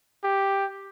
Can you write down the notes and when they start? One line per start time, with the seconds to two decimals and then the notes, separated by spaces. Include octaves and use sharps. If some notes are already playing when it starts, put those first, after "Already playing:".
0.23 G4